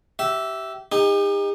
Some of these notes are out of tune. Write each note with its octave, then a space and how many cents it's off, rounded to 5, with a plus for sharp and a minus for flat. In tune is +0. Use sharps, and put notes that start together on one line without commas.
G4 -25 E5 +0
D#4 +0 G4 +45